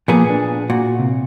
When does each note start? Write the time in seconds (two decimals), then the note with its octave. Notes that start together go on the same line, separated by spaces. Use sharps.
0.08 A#2 F3 A#3 B3 G#4
0.30 D4
0.70 A#2 F#4
0.99 C3